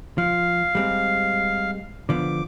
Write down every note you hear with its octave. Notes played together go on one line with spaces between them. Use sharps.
F3 F5
G3 G#3 C4
D3 F3 B3 D6